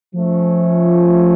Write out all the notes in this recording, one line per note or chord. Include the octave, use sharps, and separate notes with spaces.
F3 A3 C#4